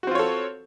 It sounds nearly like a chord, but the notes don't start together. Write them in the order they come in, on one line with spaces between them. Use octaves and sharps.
F#4 C4 F4 C#5 A4